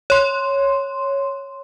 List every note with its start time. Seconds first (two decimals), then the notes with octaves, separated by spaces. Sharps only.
0.10 C#5 C6